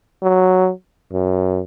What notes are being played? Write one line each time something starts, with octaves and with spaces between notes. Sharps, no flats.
F#3
F#2